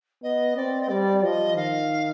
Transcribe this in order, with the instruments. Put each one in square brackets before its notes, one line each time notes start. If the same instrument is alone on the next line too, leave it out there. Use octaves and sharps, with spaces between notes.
[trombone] B3 [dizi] D#5
[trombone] C4 [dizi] D5
[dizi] D#5
[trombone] G3 [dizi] D5
[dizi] D5
[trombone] F3 [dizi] D#5
[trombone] D#3 [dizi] F5